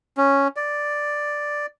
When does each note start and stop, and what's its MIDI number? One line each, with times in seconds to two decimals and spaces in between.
0.17 0.48 61
0.56 1.66 74